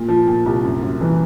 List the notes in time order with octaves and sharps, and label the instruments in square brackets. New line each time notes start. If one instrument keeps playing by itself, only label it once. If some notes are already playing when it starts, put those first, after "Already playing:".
Already playing: [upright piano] A#2
F3
A#2
C2
F#2
F#2
E3